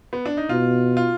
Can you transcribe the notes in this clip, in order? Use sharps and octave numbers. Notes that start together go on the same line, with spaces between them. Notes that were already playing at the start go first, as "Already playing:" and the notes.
B3
D4
D#4
B2 F4
F4